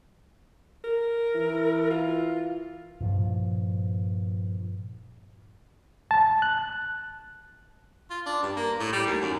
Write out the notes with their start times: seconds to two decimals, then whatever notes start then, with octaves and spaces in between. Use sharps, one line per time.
0.84 A#4
1.34 E3
1.90 F4
3.00 G2 A#2 F3
6.11 A5
6.42 F#6
8.10 F4
8.26 D4
8.43 G2
8.57 A#3
8.80 A2
8.93 G3
9.06 D#2
9.21 F#2